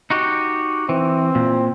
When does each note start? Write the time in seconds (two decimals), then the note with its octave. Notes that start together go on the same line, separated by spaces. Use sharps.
0.10 D#4 F#4 G4
0.89 E3 C4
1.35 A#2